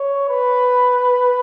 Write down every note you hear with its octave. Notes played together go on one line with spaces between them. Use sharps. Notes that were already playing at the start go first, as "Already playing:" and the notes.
Already playing: C#5
B4